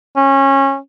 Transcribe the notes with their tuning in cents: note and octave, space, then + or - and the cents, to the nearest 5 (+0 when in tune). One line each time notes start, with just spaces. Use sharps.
C#4 -20